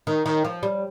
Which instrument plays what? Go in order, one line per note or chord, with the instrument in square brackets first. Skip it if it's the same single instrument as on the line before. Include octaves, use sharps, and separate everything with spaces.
[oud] D#3
D#3
F3
G3